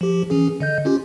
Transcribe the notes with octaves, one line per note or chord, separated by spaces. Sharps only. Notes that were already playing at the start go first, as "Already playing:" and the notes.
F3 G4
E3 C#4 G#4
D3 D#5 G6
C#4 F4 G4